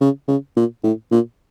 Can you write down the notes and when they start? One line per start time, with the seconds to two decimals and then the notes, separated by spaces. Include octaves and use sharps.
0.01 C#3
0.28 C#3
0.56 A#2
0.83 A2
1.11 A#2